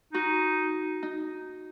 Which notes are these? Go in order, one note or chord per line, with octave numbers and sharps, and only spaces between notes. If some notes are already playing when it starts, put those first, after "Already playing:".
D#4 F#4
D#4